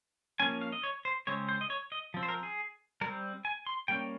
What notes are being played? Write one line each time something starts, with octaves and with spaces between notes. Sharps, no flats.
F3 A#3 C#4 G#5
F5
D#5
C#5
C5
C#3 G#3 C4 C#5
C5
D#5
C#5
D#5
F3 C4
C5
A#4
G#4
G3 C4 A#4
G#5
C6
G3 A#3 C#4 G5